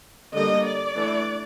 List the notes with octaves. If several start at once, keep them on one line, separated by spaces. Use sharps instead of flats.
D3 G3 A#3 D#5
D5
E3 A3 D4